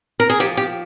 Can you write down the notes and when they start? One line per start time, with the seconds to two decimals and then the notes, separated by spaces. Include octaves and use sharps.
0.20 A#4
0.30 G#4
0.40 F3 G4
0.57 G4